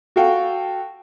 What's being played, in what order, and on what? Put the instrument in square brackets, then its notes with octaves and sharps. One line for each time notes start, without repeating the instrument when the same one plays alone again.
[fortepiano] F#4 A4 F5 G5